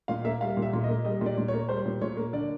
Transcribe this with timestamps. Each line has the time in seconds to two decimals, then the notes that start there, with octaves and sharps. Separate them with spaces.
0.08 A#2 F5
0.25 A#3 E5
0.41 G3 F5
0.57 A#2
0.62 E5
0.73 A#2
0.84 D#5
0.89 A#3
1.04 G3 D#5
1.21 A#2 D5
1.38 A#2
1.48 C#5
1.54 A#3
1.69 G3 C5
1.86 A#2
2.01 A#2 C#5
2.17 A#3
2.33 D3 D5